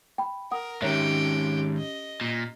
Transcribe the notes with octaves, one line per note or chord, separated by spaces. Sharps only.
G5 B5
A#4 F#5 D#6
G#2 D#3 C#4 G4 C#5 E5
D#5
A#2